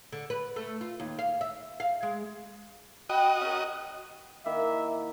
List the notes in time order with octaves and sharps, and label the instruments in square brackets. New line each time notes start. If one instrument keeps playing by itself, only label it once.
[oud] D3
B4
A3
F4
D#2
F5
E5
F5
G#3
[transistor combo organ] F#4 D#5 [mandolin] G5 B5 F#6
[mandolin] C#4 A#4
[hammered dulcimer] D#3 A#3 E4 [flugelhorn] E5